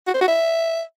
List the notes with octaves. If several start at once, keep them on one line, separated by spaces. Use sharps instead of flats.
F#4
C5
F#4
E5